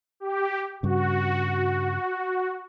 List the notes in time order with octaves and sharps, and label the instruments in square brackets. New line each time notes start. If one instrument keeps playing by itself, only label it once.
[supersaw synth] G4
[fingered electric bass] G2 C#3 [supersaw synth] F#4